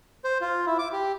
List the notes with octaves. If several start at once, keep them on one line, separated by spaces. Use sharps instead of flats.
C5
F4
E4
D6
G4